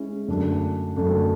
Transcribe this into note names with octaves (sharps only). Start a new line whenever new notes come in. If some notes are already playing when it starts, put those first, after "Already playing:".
Already playing: G#3 C#4 E4
F#2 D3 A3 D4
F#2 D3 A3 D4